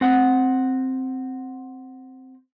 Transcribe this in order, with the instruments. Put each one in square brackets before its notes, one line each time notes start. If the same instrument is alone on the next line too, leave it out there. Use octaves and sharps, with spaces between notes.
[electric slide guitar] C4 F#5